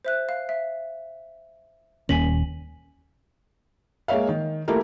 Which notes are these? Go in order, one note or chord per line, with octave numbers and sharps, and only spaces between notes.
C5 E5 F#6
F5
E5
D#1 A#3 C#4 G#5 B6 F#7
G#3 A#3 C#5 E5 F5
D#3
A3 A#3 E4 G4 A4 A#4